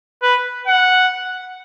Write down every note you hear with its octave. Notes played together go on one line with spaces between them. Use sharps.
B4
F#5